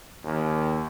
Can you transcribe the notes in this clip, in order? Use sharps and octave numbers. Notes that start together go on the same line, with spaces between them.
D#2